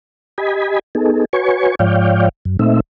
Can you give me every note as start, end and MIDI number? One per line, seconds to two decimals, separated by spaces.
0.38 0.79 67
0.38 0.79 75
0.38 0.79 80
0.38 0.79 83
0.95 1.25 59
0.95 1.25 63
0.95 1.25 68
0.95 1.25 69
1.33 1.75 66
1.33 1.75 71
1.33 1.75 73
1.33 1.75 80
1.33 1.75 85
1.79 2.29 44
1.79 2.29 53
1.79 2.29 73
1.79 2.29 74
1.79 2.29 77
1.79 2.29 79
2.45 2.57 42
2.59 2.80 46
2.59 2.80 57
2.59 2.80 60
2.59 2.80 63
2.59 2.80 76